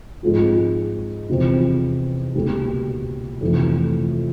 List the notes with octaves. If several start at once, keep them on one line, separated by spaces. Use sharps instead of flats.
G#2 F3 G#3 C4 F4
E2 C3 F3 G#3 C4
C#2 B2 G3 A#3
F2 C3 E3 A3